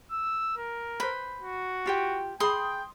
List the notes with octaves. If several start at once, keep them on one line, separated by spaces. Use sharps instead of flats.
E6
A#4
B4 C5 B5
F#4
F4 G4 G5
G#4 G5 B5 C6 D#6